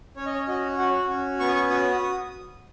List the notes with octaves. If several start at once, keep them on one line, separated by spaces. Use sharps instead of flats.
C#4 C#5
D#5
C#5
F#4 D#5
F#4 F#5
C#4
B3 C#6
D#6
C#6
F#4 D#6